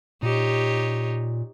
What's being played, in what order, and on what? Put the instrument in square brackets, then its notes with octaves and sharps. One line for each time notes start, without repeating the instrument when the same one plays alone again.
[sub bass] A#2 [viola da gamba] D#4 G4 C#5